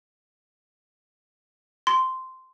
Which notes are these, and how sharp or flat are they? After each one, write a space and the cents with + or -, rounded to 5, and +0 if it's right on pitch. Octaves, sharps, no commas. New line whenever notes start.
C6 -10